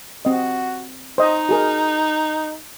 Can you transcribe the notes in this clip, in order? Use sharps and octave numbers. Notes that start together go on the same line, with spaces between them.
C4 F#4 D#5
D#4 C5 D#5
F#4 G#4 A#4